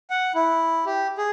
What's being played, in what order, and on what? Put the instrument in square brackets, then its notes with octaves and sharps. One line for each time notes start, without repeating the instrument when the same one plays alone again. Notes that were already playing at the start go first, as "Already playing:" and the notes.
[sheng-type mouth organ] F#5
E4
G4
G#4